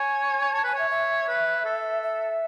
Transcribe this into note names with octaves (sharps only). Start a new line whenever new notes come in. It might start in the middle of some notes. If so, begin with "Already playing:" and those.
Already playing: C#5 G#5
C#5 A5
B4 G#5
C#5 E5
E5
B4
A4
E5